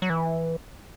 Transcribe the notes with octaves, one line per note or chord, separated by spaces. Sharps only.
F#3
E3